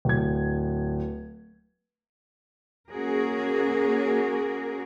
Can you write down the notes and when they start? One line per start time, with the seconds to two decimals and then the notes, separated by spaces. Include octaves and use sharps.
0.05 D1 G#6
2.91 A#3 C#4 F#4 G#4 A#4